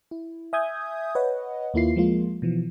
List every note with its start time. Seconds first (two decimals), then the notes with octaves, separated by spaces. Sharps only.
0.11 E4
0.53 E5 G#5 D#6 G6 G#6
1.15 B4 C#5 D#5 F#5
1.74 D#2 A#3 E4 F4 C7
1.96 F3 G#3 A#3 F4
2.42 B2 E3 F3